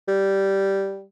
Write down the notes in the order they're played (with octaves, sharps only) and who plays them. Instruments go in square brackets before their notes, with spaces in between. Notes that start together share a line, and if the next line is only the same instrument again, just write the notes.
[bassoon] G3